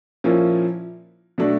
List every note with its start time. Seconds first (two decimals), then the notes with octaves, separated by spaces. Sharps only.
0.24 A#2 F3 A#3 C#4 E4
1.38 B2 F#3 A3 D4